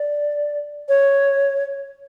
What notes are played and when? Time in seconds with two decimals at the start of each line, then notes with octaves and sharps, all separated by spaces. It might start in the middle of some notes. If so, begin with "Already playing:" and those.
Already playing: D5
0.89 C#5